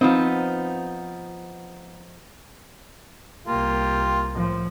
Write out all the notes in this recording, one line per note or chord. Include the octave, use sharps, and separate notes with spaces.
F3 B3 C4 D#4
C2 A#3 F4 G4
A2 F3